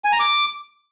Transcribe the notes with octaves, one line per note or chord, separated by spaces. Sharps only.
G#5
A#5
D6